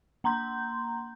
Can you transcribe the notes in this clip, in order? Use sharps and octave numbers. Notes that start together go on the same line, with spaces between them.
A#3 A#5 C6 G6